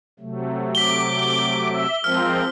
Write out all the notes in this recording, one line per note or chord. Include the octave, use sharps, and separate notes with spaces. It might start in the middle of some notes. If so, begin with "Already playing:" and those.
C3 F#3 A3
D6 B6 G7
E5
F3 G#3 C4 F4 A#4 F6